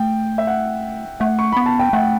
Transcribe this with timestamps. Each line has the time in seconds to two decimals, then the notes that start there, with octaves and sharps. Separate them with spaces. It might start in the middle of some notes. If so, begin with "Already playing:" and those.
Already playing: A3 G5
0.38 E5
0.47 F#5
1.20 A3 F#5
1.39 C#6
1.52 B3 B5
1.66 A5
1.79 G5
1.93 A3 F#5